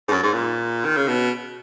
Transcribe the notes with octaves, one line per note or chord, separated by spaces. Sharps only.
G#2
F#2
G#2
A#2
D#3
C#3
B2